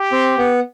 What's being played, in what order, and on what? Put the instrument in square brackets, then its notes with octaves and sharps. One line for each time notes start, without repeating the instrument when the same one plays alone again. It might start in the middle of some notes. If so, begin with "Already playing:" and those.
Already playing: [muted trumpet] G4
[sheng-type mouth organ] C4
B3